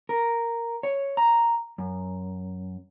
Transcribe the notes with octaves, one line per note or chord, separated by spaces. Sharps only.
A#4
C#5
A#5
F#2